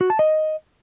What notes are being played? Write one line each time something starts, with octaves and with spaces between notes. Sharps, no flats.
F#4
A5
D#5